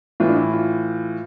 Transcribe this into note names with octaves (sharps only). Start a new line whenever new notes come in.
A2 E3 F4
D4
E4
F4